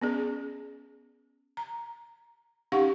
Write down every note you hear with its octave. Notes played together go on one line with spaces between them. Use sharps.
B3 C#4 G#4
A#5
C#4 D#4 G4 F5 F#5 C#6